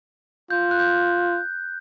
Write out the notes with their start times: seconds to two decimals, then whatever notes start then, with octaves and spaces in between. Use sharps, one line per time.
0.50 F4 G6
0.71 F#6
0.79 G6